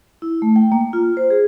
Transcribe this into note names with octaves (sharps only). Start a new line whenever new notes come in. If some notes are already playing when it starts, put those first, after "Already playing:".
E4
A3
G5
A#3
F4
C5
G#4